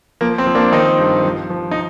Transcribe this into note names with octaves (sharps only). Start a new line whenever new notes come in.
F3 A#3
C4
F3
A#3 D4
D#3 C4 D#4
G2
F3
F3
D#4